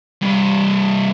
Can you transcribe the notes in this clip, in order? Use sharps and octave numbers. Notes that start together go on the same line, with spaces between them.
G2 C3